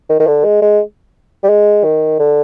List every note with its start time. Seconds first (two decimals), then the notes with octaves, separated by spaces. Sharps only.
0.09 D#3
0.20 D#3
0.27 D3
0.44 G#3
0.62 G#3
1.44 G3
1.49 G#3
1.84 D#3
2.19 D3